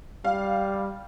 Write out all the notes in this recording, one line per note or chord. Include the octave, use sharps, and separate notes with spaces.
G3 F5